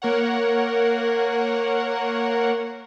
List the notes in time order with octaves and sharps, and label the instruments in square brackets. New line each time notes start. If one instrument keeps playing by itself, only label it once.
[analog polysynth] A#3 A#4 C#5 F#5